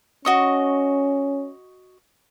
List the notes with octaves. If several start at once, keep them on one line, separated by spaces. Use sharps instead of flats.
C#4 F#4 D#5 C#6